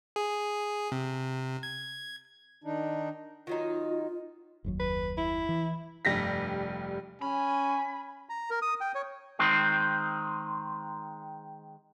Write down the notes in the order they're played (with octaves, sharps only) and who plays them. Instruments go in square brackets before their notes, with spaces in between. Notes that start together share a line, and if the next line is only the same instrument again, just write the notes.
[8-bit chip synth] G#4
C3
G#6
[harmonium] D#3 D4 D#4
[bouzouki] D#3 F#3 D#4 [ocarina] F4
[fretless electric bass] F#1 D#2 F#3
[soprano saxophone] B4
E4
[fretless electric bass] E3
[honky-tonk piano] F1 G2 G4 A#6 B6
[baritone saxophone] C#4 [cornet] G#5 [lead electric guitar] B5
[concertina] A#5
A#4
D#6
G5
C#5
[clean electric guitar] D#3 G#3 C4